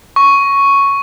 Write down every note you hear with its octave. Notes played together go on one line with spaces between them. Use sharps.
C#6